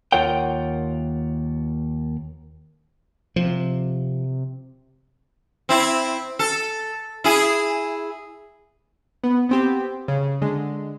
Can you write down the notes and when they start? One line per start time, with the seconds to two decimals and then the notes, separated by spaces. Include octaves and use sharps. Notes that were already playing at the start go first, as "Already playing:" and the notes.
0.12 D#2 F4 A#4 C#5 F#5 G5
3.36 C3 F3
5.69 C4 E4
6.39 A4
7.24 E4 G#4
9.24 B3
9.49 B3 C4 G4
10.08 C#3
10.41 D3 G#3